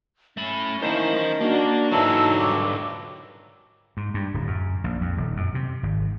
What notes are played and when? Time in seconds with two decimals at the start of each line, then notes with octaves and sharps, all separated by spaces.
0.37 A3 C#4 B5
0.82 D#3 A#3 E4 C5 A5
1.41 A#3 D4 F#4
1.92 G#2 D3 E3 F#3 D#4 A5 E6
2.38 G2 D#3 D6
3.97 G#2
4.14 G2
4.34 D1
4.47 F#2
4.84 A#1
5.01 F2
5.17 D#1
5.37 F#2
5.55 C3
5.83 G#1